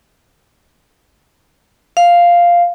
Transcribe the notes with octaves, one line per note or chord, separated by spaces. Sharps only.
F5